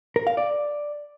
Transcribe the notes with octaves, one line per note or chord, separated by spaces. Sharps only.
A#4
F5
D5